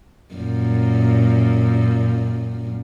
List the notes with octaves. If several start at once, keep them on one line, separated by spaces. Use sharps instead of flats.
F#2 A#2